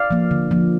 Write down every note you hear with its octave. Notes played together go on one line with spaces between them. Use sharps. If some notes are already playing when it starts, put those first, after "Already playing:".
Already playing: D5 F5
F3 A#3
D3
F3 A#3